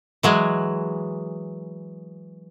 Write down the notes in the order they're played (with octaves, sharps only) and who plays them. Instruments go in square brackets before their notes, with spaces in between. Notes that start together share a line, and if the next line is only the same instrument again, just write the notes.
[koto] E3 F#3 G#3